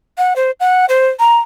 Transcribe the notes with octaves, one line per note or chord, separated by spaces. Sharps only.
F#5
C5
F#5
C5
A#5